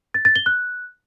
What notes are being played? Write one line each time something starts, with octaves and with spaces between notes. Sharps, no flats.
A6
A6
G7
F#6